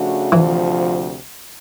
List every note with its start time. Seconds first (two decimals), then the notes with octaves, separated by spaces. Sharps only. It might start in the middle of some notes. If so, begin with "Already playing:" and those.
Already playing: C#3 F3 A3 D4 F#4
0.32 D2 C3 E3 F3